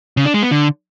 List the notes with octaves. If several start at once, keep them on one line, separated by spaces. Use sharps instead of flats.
C#3
D4
G#3
B3
D3